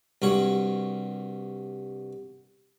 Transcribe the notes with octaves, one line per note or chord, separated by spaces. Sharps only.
C2 G2 F#4 C#5